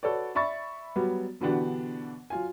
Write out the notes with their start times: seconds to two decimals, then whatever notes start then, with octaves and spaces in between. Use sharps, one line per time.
0.03 F#4 A4 B4 C#5 D5
0.35 D5 E5 B5 C#6 A6
0.96 F#3 G3 B3
1.40 B2 D3 E3 B3 D4 G4
2.30 F#3 F4 G#5